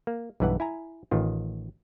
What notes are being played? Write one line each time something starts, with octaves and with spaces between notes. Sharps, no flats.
A#3
B1 G2 E3 B4 F#5
E4 G#5 A#5
A1 D#3 F4